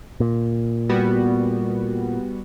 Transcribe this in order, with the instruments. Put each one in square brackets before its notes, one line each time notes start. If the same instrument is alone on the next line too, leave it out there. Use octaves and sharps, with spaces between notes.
[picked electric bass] A#2
[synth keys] G3 B3 F#4